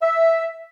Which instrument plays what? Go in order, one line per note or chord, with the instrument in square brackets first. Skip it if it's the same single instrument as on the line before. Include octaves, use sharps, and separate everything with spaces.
[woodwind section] E5